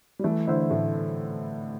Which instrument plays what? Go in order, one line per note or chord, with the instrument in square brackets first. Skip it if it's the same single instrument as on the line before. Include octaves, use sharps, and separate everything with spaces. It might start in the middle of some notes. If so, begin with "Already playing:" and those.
[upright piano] G3
[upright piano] E3 [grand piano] A3
[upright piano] D3 [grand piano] E4 C5 E5
[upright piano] A2 [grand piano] A3